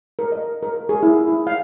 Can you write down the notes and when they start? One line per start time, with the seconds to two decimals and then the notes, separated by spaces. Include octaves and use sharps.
0.19 A#4
0.32 D#5
0.63 A#4
0.89 G#4
1.03 E4
1.28 E4
1.47 F5